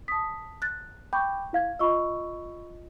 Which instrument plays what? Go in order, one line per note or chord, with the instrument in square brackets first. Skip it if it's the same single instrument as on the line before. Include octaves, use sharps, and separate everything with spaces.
[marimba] A5 D#6 [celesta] B6
[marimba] F#6 A6
[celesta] G5 B5 D6 [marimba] C#6 G6
[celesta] E4 F5 G#6
[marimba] F4 D#5 [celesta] B5 C#6 E6